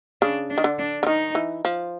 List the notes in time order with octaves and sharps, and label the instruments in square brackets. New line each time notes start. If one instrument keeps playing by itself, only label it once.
[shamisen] C#3 [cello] D4
[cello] D4
[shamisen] D#3
D3
[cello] D4
[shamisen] D3
[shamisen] D#3 [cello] D#4
[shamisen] E3
F3